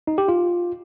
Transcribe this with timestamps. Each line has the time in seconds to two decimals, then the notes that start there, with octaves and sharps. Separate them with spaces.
0.07 D#4
0.18 G4
0.28 F4